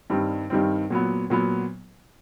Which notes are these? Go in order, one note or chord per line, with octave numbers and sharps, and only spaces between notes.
G2 D#3 G3 C4
G2 D#3 G3 C4
A#2 F#3 B3
A#2 F#3 B3